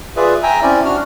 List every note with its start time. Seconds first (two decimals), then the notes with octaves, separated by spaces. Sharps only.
0.16 F4 G#4 B4 D5 E5
0.43 E5 G5 G#5 A#5
0.62 C4 C#4 E4 D5
0.85 D4 F#4 F6